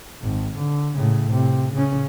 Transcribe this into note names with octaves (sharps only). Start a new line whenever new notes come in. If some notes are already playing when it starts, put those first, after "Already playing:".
G#1
D3
A2 C#3
C3
C#3 C#4